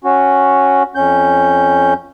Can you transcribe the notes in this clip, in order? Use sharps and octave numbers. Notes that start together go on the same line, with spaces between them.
C#4 F#4
F2 C#4 G6